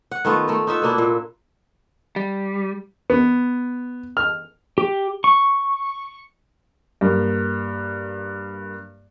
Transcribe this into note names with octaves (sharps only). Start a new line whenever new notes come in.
F#5
D#3 A3 B3 F4
A3 A#4
D#4 F4 E5 F#5
B2 A#3 D4 E4
A#2
G3
B3
F6
G4
C#6
G2 A#3